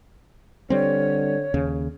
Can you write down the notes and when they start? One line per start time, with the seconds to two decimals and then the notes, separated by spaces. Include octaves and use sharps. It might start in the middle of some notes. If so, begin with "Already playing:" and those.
0.70 D3 G3 C4 C#5
1.54 D#2 C#3